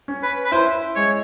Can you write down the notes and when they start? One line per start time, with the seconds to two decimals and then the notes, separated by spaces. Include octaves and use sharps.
0.08 C#4
0.23 B4
0.45 B4
0.52 E4 C5
0.96 G#3 C#5